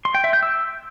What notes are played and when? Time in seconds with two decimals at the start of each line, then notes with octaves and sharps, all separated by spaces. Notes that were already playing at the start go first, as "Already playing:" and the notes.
0.05 C6
0.15 G5
0.24 E5
0.33 G6
0.43 E6